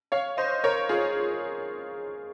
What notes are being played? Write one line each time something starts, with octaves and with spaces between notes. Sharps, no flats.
C#5 F5
C5 D#5
A#4 C#5
F4 G#4